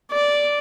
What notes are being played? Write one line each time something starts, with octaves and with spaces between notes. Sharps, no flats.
D5